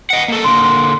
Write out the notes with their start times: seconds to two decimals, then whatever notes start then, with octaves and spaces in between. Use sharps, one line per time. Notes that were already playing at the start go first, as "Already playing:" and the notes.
0.10 D#5 F#5
0.28 A#3 A4
0.44 D3 A#3 C6